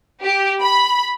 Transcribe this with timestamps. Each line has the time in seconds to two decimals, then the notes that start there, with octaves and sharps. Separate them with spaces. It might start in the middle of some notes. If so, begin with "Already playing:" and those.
0.23 G4
0.60 B5